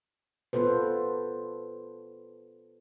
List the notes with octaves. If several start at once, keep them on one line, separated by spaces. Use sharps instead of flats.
B3 F4 A4 B4 C5